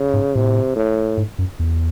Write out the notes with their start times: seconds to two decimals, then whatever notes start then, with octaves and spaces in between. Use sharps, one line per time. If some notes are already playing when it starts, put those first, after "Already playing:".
Already playing: C#3
0.13 G#2
0.35 A2 C3
0.76 A2
1.17 G#2
1.39 F#2
1.59 E2